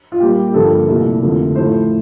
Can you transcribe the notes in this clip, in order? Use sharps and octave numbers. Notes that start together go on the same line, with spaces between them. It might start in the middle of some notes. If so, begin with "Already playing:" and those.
F4
A#2 G3 A#3 G4
G4
G2 D3 F3 A#3 A4
C2 A#2 A3 A#4
F2 D3 A3
A2 F3 A3 C5